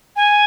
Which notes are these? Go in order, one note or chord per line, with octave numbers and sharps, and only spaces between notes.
G#5